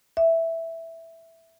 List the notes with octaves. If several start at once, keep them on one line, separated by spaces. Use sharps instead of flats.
E5